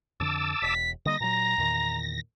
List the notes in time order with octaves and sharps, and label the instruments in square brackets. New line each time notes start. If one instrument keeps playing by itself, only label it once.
[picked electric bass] F2 D3 [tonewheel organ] A5 D6 E6
[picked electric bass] E1 [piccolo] B6
[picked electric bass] D3 G3 A#3 [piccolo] D#5 [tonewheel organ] A#6
[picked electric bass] A#2 F#3 [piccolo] A#5
[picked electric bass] E2 A#2 D#3